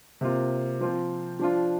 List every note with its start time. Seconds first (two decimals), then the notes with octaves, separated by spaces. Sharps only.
0.21 C3 A#3 F4
0.81 F3 C4 F4
1.39 F3 D4 F4